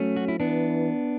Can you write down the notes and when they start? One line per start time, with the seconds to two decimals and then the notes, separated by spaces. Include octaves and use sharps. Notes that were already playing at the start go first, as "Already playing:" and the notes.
Already playing: F#3 A3 C#4
0.16 F#4
0.28 E4
0.39 E3 B3 D4